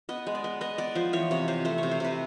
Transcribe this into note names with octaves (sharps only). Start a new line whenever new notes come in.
B3 D#5
G#3
D5
B3
B3 D#5
B3 D5
F3 C5
E3 C#5
C3 C#5
C3 C5
A3 C5
C3 C#5
C5
C3 B4